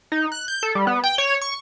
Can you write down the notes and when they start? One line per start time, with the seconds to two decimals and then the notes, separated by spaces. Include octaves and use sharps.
0.12 D#4
0.32 F#6
0.48 G6
0.63 A4
0.75 G3
0.87 B3
1.04 G5
1.18 C#5
1.42 C#6